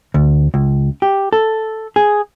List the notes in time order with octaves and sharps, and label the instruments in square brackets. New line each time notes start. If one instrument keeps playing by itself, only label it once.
[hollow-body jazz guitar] D2
C#2
G4
A4
G#4